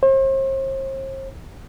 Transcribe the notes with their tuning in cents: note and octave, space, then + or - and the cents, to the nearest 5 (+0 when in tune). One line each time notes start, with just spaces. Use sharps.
C5 +40